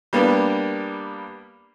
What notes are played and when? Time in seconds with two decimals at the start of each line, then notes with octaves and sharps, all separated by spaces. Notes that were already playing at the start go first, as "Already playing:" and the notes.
0.13 G3 A#3 B3 D4